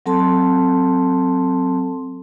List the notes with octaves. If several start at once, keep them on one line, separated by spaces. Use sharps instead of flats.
F#3 C4 A4 A5 C6